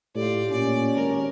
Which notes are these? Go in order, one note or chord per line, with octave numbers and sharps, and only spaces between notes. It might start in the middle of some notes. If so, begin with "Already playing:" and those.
A2 F4 G4 D5
A#2 C#4 D5
G#1 A#4